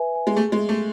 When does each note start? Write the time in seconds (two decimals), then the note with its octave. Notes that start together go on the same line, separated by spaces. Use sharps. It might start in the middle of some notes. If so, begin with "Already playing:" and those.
Already playing: B4 E5 G#5
0.15 G#5
0.27 G#3
0.36 A3 G#4
0.52 G#3
0.58 E5
0.69 A3